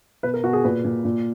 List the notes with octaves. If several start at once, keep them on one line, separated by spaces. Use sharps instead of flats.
B2 B4
A#4
B2 F#4
G#4
A#2 B4
A#2
A#2